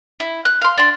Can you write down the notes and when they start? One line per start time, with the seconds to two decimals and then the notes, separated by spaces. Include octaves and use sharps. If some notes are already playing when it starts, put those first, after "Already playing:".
0.20 E4
0.45 F#6
0.61 F5 C6
0.78 D4 C6